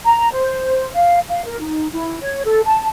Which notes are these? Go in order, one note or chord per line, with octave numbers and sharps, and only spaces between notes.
A#5
C5
F5
F5
A#4
D#4
E4
C#5
A4
A5